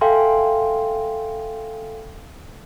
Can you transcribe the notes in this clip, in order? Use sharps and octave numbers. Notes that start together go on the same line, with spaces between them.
A4 E5 F5 G5 G#5 C6